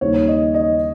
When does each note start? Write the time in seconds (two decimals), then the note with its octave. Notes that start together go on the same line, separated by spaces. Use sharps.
0.01 D#2 C#3 G3 A#3 D#4 C#5
0.28 D#5
0.54 D#5